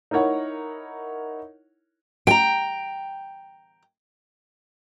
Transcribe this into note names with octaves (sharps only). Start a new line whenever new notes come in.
D#4 E4 A#4 C#5 F#5
G5 A#5